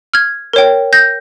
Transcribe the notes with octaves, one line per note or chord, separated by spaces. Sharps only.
F6 G#6
A#4 C#5 G5
G6 A#6